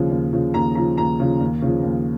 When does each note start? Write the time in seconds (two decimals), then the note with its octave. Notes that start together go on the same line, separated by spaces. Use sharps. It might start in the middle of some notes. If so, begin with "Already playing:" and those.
Already playing: D#2 C#3 F3
0.11 D#2
0.33 C#3 F3
0.54 D#2 A#5
0.75 C#3 F3 A#5
0.98 D#2 A#5
1.20 C#3 F3
1.41 D#2
1.62 C#3 F3
1.83 D#2